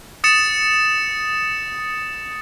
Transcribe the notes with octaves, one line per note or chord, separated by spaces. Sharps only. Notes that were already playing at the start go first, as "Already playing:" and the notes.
D#6 A6 C#7 E7